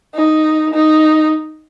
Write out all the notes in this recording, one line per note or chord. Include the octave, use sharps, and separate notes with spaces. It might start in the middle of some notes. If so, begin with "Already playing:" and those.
D#4
D#4